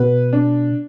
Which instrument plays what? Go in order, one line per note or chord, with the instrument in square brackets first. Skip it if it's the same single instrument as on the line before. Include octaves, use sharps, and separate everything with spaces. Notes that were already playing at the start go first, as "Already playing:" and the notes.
Already playing: [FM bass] B2 [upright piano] B4
[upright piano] D4